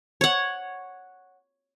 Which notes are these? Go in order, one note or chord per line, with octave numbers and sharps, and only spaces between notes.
C#5 F#5